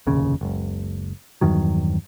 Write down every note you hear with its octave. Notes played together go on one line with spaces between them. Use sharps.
F1 A#1 D#2 C#3
F#1 C#2
E2 G2 D#3 F#3